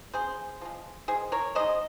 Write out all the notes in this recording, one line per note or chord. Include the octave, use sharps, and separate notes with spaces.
C#3 G#4 C5
F3 G#3
D#3 G#4 C5
A#4 C#5
G#3 D#4 C5 D#5